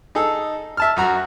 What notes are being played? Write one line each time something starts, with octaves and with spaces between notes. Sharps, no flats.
D#4 G#4 A4
E5 A5 F6
F#2 F#4 A#5